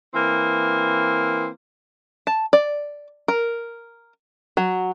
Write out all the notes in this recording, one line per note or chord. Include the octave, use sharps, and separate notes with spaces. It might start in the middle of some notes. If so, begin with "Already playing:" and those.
E3 A#3 C4
A5
D5
A#4
F#3